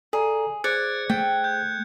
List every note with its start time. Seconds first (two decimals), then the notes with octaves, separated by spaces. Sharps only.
0.13 G#4 A4 D5 A#5
0.64 G#4 C5 D5 F#6 G#6 C#7
1.10 A3 G5
1.44 G6